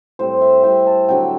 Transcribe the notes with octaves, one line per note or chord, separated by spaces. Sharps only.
A2 G3 C4 C5
E5
A2 G3 C4 G5
A5
D3 F#3 C4 G5